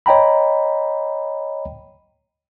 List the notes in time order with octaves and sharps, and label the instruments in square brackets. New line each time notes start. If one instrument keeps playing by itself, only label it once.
[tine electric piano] C#5 D#5 G5 A#5 B5